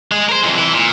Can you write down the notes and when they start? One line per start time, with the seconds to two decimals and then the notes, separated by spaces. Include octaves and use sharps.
0.12 G#3
0.29 A#4 C5
0.43 F2 E3
0.58 E3 E4
0.73 A#2